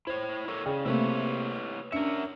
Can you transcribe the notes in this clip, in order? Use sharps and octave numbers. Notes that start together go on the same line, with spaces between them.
E4 C5 C#5
A4 A#4 C#5
C#3 G#4 D5 G5
C3 A3 A#3 E4 B4 C#5
C#4 D4 A#4 E5 C#7